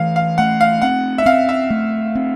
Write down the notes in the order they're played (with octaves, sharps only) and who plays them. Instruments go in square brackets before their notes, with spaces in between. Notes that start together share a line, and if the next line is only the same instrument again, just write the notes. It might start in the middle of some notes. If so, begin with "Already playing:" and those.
Already playing: [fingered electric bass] E3 A3 [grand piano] F5
[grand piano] F5
[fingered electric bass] A3 [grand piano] F#5
[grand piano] F5
[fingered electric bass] C4 [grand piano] F#5
[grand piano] E5
[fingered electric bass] C4 [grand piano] F5
[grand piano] E5
[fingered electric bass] A3
C4